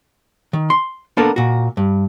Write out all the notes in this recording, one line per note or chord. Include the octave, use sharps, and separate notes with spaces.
D#3
C6
A#3 B3 D4 A4 A#4 A5
A#2 F#4
G2